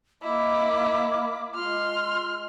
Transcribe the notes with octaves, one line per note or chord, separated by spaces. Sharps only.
A#3 E4 D#5 D6
G#3 F4 C6 F6